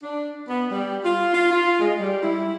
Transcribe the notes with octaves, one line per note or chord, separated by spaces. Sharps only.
D4
B3
G3
F4
F4
F4
G#3
G3
E4